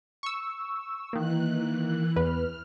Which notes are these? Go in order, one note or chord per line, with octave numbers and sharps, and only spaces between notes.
C#6 E6
D#3 E3 A#3 F#6
E2 B4 F6